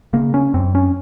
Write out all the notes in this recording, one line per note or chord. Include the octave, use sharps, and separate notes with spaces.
C#3 A#3
C#4
F#2 C4
C#4